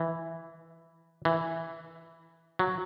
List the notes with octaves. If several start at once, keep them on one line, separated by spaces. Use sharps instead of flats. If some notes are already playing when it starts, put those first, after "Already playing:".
Already playing: E3
E3
F#3